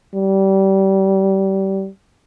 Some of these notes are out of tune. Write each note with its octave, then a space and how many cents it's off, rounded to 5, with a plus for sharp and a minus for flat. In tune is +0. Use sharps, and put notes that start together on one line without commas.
G3 -25